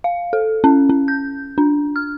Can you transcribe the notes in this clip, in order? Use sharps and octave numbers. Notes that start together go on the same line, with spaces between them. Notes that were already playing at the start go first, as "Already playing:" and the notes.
F5
A4
C#4
C#4
G6
D4
F6